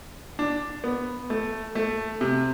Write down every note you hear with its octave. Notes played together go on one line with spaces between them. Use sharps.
D4
B3
A3
A3
C3